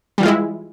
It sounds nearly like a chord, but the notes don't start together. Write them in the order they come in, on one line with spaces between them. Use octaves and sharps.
G3 E3 F4 G#3 E4